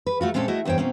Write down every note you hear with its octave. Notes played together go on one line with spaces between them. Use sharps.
B4
A3 F4 F#4
A#2 G#3 C4 C#4 A4
A3 E4 F#4 D#5
E2 G2 C5 C#5 G5
B2 A#3 C4 C#4